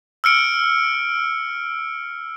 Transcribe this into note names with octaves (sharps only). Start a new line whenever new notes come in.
E6 F6 C#7 D7